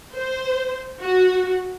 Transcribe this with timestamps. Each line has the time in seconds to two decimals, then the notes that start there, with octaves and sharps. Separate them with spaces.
0.14 C5
1.01 F#4